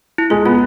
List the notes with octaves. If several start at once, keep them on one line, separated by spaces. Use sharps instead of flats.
E4
G#3 F4
B3 F4